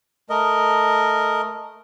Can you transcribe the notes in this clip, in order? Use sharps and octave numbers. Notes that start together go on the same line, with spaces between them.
A3 A#4 D#5